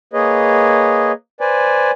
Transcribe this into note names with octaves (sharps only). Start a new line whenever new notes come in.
A#3 G#4 B4 C#5 D#5
B4 C5 D5 G#5